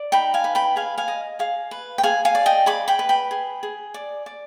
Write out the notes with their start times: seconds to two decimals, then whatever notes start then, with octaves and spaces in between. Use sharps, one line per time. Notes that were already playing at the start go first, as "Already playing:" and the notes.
Already playing: D5
0.12 D#4 G5 B5
0.34 F5 G#5
0.44 B4
0.55 G5 B5
0.76 G#4 F5 G#5
0.98 F5 G#5
1.08 D#5
1.39 G#4 F5
1.71 B4
1.98 G5
2.03 G#4 F5 G#5
2.25 F5 G#5
2.35 D5
2.46 D#5 G5
2.66 G#4 B5 D6
2.88 G5 B5
2.99 B4
3.09 G5 B5
3.31 G#4
3.63 G#4
3.94 D5
4.26 D5